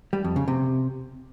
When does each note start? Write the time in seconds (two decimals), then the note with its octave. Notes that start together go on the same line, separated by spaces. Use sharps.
0.13 G3
0.24 F2
0.36 C#3
0.48 C3